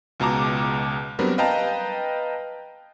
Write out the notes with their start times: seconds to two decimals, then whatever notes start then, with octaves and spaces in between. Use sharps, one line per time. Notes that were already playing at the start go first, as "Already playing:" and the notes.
0.20 C#2 B2 A5 A#5 D6
1.19 F#3 G3 B3 C4 D4 A#4
1.38 B4 D#5 F5 G5 A5 A#5